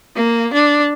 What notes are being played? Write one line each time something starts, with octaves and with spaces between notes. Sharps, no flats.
A#3
D4